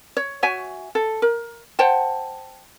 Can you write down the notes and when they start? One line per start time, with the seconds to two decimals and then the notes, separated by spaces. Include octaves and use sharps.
0.17 C#5
0.43 F#4 C#5 E5 G#5
0.95 A4
1.22 A#4
1.79 C5 F#5 G5 A5